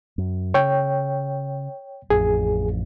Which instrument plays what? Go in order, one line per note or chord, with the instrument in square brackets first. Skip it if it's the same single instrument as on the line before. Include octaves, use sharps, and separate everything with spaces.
[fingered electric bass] F#2
[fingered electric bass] C#3 [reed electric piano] C#5 G5
[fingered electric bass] A1 F2 [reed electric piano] G#4